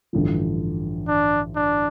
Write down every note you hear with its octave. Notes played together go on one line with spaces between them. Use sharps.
A1 G2 D3 F3
D4
D4